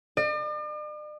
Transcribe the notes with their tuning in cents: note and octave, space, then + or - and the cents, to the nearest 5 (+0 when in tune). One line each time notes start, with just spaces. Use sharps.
D5 +45